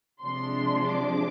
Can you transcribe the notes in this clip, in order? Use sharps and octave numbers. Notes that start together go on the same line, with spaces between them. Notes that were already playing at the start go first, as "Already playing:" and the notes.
C3 F3 G#3 D4 C6
D6